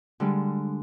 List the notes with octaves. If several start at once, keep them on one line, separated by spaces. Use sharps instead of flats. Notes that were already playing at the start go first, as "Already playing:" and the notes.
D3 G3 G#3